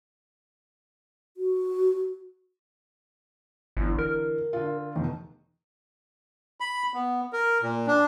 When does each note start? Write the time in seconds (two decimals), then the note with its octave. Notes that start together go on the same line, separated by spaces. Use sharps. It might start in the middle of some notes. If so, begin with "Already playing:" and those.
1.37 F#4
3.77 G1 D3 E3
3.98 A#4
4.53 D3 F4
4.95 F1 E2 D#3
6.60 B5
6.94 B3
7.33 A#4
7.62 A#2
7.87 D4